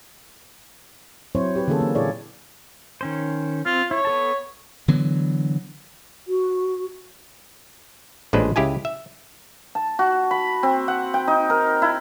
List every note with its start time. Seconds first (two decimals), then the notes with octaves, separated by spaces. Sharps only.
1.35 F#3 C4 E4 C5 C#5
1.56 G4 B4
1.68 D3 E3 A#3 C#4 G#4 A4
1.81 A#3
1.95 A#2 E4 G#4 C#5 D5
3.01 D#3 C#4 C5
3.66 C4 F4
3.91 E4 C#5
4.05 B3 A4 A5
4.88 D3 E3 F#3 B3
6.28 F#4
8.33 A1 A#2 G#3 D4 B4 C5
8.56 C#2 E4 G4 G#4 G#5
8.85 E5
9.75 A5
9.99 F#4
10.31 B5
10.63 C4
10.88 F#5
11.14 G5
11.28 D#4
11.50 A#4
11.82 E4